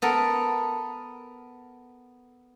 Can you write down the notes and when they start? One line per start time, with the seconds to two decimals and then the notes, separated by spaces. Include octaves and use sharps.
0.02 B3 A4 A#4